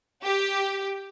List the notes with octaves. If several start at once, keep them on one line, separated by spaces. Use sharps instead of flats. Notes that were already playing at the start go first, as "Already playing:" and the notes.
G4